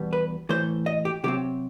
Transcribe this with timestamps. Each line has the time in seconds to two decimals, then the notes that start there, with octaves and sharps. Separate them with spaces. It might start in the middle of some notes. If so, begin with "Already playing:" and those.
Already playing: E2 B2 G3 B3
0.13 B4
0.49 A2 E3 A3 C5
0.86 D#5
1.05 G4
1.24 C3 F#3 C4 G4